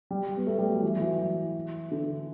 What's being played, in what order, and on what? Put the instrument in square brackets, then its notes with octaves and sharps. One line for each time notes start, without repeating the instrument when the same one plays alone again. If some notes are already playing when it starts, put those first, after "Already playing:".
[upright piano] G3
B3
A3
G3
F#3
E3
F#3
E3
D3